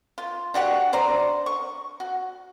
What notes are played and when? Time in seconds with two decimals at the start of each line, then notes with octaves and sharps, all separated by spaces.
0.18 F4
0.54 D4 F#4 G4 F#5
0.93 D4 C5 D5 A#5
1.46 C#6
2.00 F#4